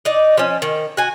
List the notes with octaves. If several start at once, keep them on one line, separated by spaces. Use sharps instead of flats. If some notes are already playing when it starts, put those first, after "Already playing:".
D#4 D5
F3 C#4
D#3
F#4 G#5